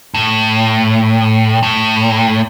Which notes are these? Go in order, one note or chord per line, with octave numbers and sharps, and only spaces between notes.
A2
A2